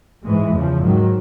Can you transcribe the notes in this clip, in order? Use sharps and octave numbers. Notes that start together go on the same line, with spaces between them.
G#2 E3 G#3
E2 C#3 F3
G#2 D#3 F#3